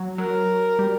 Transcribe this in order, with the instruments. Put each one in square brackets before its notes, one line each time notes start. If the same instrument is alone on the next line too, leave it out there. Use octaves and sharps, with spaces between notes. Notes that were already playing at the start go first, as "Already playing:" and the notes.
Already playing: [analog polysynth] F#3
[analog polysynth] F#3 [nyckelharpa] A#4
[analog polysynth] G3